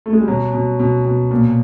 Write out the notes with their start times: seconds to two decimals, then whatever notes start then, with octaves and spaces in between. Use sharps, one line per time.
0.06 A3
0.13 G#3
0.21 G3
0.28 B2 F#3
0.53 B2
0.79 B2
1.05 B2
1.31 A#2